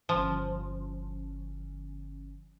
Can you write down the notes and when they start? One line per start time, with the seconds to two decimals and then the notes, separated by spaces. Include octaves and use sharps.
0.09 G1 F3 C#4